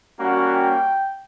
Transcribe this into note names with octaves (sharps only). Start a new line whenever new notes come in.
G3 A#3 C#4 F#4 F#5
G5